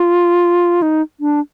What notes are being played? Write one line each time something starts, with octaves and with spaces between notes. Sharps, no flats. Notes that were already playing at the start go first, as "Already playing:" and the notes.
Already playing: F4
D#4
D4